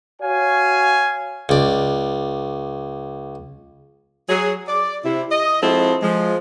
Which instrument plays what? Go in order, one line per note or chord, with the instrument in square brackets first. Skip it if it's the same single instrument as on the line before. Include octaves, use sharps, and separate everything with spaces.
[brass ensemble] F#4 C#5 F5 G#5
[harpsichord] C#2 D5
[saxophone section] F#3 G#4
D5
C3 E4
D#5
F3 G#3 C4 E4 F#4 A4
F3 G#3